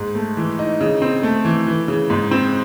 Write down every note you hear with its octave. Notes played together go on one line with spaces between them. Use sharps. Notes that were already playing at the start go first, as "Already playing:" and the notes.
Already playing: G#2
A3
E3
D#4
C#3
C4
A3
E3
E3
C#3
G#2
C4